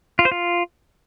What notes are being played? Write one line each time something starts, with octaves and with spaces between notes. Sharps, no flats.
F4
C5
F4